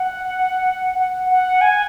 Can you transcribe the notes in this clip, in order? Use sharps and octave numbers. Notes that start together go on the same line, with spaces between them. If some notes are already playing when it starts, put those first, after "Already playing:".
Already playing: F#5
F#5
F#5
G#5